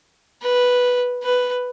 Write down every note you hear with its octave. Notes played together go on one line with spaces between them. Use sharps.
B4
B4